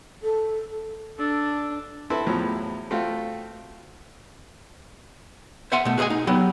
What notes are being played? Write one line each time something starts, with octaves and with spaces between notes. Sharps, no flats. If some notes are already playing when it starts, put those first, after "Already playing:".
A4
D4 A4
C4 E4 A4 B4 C5
E2 A2 F3 F#3
A3 C4 F4 F#4
C5 E5 F#5 G#5 C6
B2 A3
F#4 G#4 B4 D#5 G#5
D#4
F#3 B3 G4